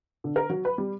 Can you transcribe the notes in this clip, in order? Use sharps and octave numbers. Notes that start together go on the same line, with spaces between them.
D3
A#4
F#3
B4
G3